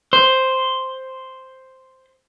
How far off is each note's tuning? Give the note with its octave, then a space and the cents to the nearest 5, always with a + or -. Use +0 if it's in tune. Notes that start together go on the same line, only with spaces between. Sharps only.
C5 +0